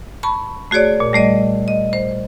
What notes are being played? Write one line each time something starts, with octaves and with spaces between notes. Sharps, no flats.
A5 B5 C#6
A3 F#4 G#4 C#5 D5
A#2
G3 A3 D5 D#5
D#5
C5